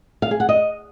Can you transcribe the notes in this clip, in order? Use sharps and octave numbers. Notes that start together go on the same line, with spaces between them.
F5
G#4
F#5
D#5